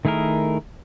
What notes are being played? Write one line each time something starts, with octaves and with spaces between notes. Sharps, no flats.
D#3 A3 E4 G#4 A#4